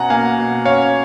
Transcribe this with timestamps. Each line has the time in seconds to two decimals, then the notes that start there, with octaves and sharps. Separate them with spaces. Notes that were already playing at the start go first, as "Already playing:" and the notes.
Already playing: B2 C#4 F#5 G#5 A#5
0.10 A#3 F5 G#5
0.38 B2
0.65 C#4 C#5 F5